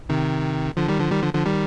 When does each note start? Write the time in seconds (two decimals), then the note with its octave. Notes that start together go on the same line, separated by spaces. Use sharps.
0.09 C3 D#3
0.77 D3 F3
0.89 D#3 G3
0.99 D3 F3
1.11 D#3 G3
1.22 D3 F3
1.34 D3 F3
1.46 D#3 G3